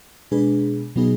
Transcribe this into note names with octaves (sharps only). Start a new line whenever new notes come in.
B2 G#3 D4 G#4 B4
B2 F#3 B3 D#4 G#4